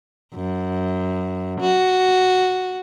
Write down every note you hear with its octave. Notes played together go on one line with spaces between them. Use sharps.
F#2
F#4